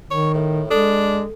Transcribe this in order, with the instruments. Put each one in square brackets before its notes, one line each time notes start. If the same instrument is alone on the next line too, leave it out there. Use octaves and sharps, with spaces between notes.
[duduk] D#3 [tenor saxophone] C#5
[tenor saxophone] A2
[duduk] G#3 [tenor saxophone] D4 [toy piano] A4